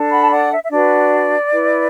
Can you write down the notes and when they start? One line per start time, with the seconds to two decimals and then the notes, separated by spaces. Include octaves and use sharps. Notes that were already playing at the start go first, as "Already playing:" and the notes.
Already playing: D4 A4
0.10 F#5 B5
0.20 A5
0.30 D5 F#5
0.51 E5
0.63 E5
0.71 D4 F#4 B4 D5
1.52 E4 B4